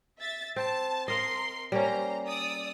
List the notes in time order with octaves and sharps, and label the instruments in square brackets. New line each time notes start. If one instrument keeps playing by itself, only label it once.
[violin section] E5 A6
[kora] C4 [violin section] A5
[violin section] A#4 C6 [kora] D#5 F5
[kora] G3 A#3 C#4 [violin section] C5 A#5
[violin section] D5 D#6 E6